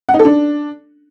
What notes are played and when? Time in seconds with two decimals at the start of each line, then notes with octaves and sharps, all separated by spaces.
0.09 F#5
0.14 D#4
0.19 A4
0.25 D4